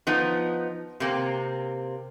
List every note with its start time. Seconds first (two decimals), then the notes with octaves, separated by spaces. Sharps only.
0.07 F3 B3 D#4
1.00 C3 A#3 C4